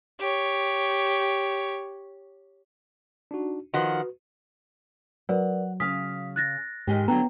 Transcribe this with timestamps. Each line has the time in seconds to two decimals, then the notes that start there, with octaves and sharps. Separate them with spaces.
0.20 G4 C#5
3.31 D4 D#4 F#4
3.74 D#3 F3 F#4 B4 F#5
5.29 F#3 A#4 B4 D5 F#5
5.80 C#3 F5 D#6 B6
6.36 F#6 A6 A#6
6.87 G#2 D#3 G#3 G4
7.08 D3 F#3 B3 G5 A#5